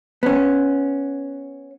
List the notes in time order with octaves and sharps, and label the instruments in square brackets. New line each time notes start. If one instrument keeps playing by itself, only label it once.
[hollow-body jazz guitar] B3 C#4